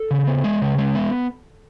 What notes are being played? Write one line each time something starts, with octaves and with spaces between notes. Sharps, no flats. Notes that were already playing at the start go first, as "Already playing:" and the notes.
Already playing: A4
C#3
B3
G#3
C#3
G#3
B3